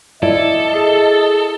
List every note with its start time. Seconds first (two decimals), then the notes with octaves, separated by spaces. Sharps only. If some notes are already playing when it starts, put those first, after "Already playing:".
0.22 E4 A4 D5 D#5
0.73 G#4